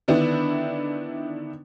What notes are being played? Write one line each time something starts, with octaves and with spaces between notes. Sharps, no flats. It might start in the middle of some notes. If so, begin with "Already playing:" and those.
D3 D#3 B3 D4 E4